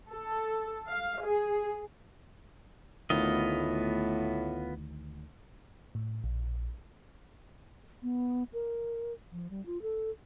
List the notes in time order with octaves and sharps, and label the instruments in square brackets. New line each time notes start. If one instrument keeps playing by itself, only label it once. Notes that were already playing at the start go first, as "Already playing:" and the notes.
[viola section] A4
F5
G#4
[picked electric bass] D2 D#3 [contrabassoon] A2 [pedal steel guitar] B3 F4 D#5
[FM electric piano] A2
A#1
[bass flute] B3
A#4
F3
G3
F4
A4